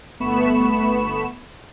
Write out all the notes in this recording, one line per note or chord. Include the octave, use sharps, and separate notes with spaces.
G1 A3 B3 B5 C#6 E7